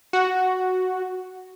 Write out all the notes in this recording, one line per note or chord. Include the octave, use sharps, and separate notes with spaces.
F#4